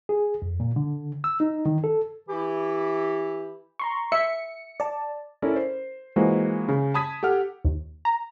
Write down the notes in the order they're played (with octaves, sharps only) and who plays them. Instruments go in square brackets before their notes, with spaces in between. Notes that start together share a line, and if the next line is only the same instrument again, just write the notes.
[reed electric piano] G#4
F2
A#2
D3
E6
D#4
D#3
A4
[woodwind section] E3 E4 G4
[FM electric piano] A#5 C6 C#6
[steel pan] E5 [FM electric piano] C#7
[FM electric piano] D5 A5
[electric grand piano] C#4 E4 A4 A#4 D5
C5
E3 F3 G#3 A#3 F#4 C5
C#3
A5 B5 D#6 G#6 B6
G4 A4 F#5 F6
[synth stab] D#2
A#5